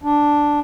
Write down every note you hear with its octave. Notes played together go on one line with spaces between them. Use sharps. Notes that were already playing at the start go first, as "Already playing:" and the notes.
D4